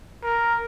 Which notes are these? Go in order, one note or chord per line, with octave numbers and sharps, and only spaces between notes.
A#4